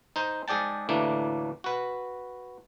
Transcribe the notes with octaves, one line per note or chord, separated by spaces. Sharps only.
D#4 C5
G#2 G#4 D5 G5 A5
D2 A2 E3 A#3 D4
F#4 B4